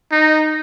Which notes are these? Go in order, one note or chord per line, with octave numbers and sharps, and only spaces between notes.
D#4